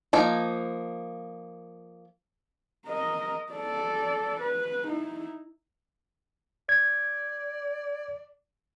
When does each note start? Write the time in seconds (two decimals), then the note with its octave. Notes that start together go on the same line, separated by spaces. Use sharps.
0.13 F3 A#3 D#4
2.86 A#4 D#5
3.53 A4 D5
4.40 B4
4.87 D#4 E4
6.69 D5 G#6